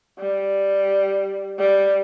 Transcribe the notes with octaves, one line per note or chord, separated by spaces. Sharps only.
G3
G3